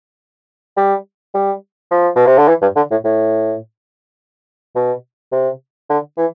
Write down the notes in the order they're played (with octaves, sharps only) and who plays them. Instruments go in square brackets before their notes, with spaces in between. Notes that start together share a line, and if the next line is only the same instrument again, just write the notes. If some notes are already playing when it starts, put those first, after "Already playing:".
[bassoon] G3
G3
F3
B2
C3
D3
E3
G2
D3
A2
A2
B2
C3
D3
E3